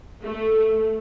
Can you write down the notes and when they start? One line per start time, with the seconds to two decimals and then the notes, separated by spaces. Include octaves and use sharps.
0.23 A3